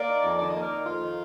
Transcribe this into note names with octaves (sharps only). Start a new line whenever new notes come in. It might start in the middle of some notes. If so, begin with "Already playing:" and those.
Already playing: A#3 A#4 D5
D#4
F2
D#3 D5
A#3 D#5
A#4 D5
D#4
F2 F4
D#3